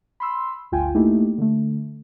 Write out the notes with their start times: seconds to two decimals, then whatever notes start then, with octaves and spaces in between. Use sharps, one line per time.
0.20 B5 C6 E6
0.72 G1 D2 F4 G5 G#5
0.95 A3 A#3 D#4 E4 G4
1.38 D3 A3